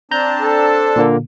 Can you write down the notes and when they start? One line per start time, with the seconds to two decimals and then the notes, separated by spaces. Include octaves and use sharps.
0.11 C4 D4 A5 A#5 G6
0.41 A4
0.96 A#2 D3 A#3